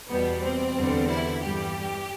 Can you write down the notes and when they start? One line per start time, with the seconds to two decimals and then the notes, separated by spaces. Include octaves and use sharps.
0.09 E2 B2 G3 B3
0.43 C4
0.76 E2 D3 G3
1.09 E4
1.42 G2 E3 G3 G4